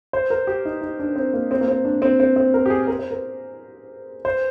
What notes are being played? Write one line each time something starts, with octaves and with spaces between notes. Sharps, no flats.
C5
A#4
G4
D#4
D#4
D4
C4
A#3
C4
A#3
C4
D4
C4
C4
C4
A#4
G4
G#4
A#4
C5
A#4
C5